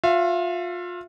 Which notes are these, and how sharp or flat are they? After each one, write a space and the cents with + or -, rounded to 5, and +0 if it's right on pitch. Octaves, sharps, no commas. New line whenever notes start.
F4 +30 E5 +40